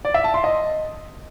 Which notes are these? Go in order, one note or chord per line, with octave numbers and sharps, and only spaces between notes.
D5
E5
A5
C6
D#5